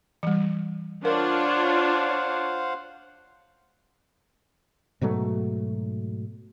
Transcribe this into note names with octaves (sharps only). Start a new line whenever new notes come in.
E3 G3
D4 F4 A#4 C5 C#5 F5 F#5
G#2 B2 F#3 A3